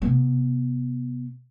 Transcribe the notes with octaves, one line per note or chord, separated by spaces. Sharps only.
C3 B3